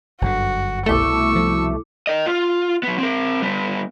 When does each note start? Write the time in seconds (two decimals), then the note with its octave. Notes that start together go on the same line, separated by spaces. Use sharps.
0.21 G1 F#2 D3 F#4
0.86 C2 B2 A3 E4 C#6 D6 E6
1.36 F3
2.07 A#4 D#5
2.26 F4
2.83 F#3 B3
2.99 C4 A#4
3.42 G3 B3